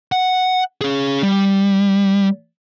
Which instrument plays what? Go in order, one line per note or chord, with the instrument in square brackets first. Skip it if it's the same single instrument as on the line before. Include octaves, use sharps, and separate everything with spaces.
[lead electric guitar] F#5
C#4 G#4
G3